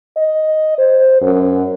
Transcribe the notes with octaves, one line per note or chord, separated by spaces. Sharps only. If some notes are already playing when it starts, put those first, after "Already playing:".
D#5
C5
F#2